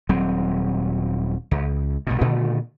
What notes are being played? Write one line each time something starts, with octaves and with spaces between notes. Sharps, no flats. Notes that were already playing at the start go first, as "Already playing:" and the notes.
D#1 F#3 C4
C#2
B1 G2 B2
A#2 D3 D#3 A3